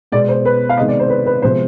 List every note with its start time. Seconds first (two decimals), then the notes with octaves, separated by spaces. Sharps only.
0.12 B2 G#3 B3 D5
0.29 C5
0.45 B4
0.69 F5
0.77 C3 D#3 G#3 B3 D#5
0.88 D5
1.00 C5
1.10 B4
1.26 B4
1.42 C3 F3 G#3 B3 C5